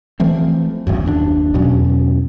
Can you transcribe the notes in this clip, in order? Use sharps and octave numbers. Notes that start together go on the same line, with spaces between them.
E3 F3 A3 C4
D1 G1 F#2
F#1 D#2 C#4 D4
E2 B2 F#3 C#4